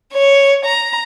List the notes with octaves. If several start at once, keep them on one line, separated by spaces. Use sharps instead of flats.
C#5
A#5